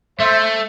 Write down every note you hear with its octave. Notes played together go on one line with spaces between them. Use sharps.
A3 C5 E5